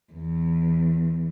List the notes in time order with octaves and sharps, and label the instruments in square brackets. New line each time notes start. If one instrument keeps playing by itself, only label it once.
[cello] E2